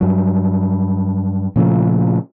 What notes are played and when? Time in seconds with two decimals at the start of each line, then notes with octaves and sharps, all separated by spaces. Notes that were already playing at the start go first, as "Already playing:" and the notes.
0.01 G2 F#3
1.56 A#2 C#3 F3 A3